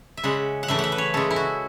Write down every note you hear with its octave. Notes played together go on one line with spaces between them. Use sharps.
E5
C#3 G#3 F#5
F#5
C#3 E3 A3 E5
F#5
E5
B4
C#5
C#3 G#3 A4
E4
F#4